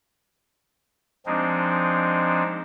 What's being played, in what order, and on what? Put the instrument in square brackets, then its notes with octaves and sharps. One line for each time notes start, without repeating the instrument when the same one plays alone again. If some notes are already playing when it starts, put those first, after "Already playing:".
[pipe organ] F3 G#3 C4 D4 D#4